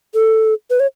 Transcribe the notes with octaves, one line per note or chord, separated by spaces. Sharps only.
A4
B4
C#5